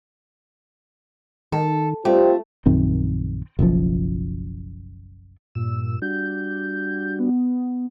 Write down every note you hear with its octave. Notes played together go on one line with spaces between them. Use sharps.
D#3 A4
G3 A3 C4 F4 G4
A#1 F#2 D#3 C4
F#1 B1 F#2 F3
G2 A#2 E6
G3 D4 F#4 G6
B3